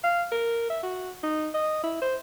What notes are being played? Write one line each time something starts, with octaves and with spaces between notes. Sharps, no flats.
F5
A#4
E5
F#4
D#4
D#5
E4
C5